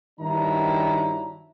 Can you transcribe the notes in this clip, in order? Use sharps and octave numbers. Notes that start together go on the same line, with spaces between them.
G2 D#3 F#3 D4 E4 A#5